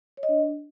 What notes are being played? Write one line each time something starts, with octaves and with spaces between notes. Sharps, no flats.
C#5
D#5
D4